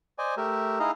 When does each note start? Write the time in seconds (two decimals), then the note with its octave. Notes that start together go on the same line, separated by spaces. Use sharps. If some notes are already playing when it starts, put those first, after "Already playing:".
0.18 C5 D5 D#5 G#5
0.37 A3 G4 A#4 E5
0.80 D#4 E4 G#4 D#5 F5 A#5